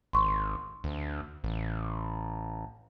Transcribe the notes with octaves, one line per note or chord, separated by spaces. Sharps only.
G#1 C6 C#6
D2
A1